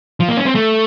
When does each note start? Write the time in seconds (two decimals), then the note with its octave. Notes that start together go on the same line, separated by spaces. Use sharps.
0.20 F3
0.29 A#3
0.37 C#4
0.46 C4
0.55 A3